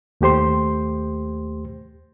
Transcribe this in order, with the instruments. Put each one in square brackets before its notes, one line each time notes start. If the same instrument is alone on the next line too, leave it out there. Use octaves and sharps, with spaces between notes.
[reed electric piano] D#2 A3 G4 C5 C6